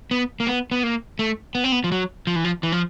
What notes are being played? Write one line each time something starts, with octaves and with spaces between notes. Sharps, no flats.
B3
A#3
B3
B3
A#3
A3
B3
C4
B3
F3
F#3
F3
E3
F3
E3
F3